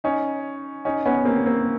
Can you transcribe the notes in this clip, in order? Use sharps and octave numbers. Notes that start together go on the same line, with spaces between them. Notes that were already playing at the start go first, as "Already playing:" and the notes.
C#4 D#4
C#4 D#4
B3 C#4
A#3 C4
A#3 C4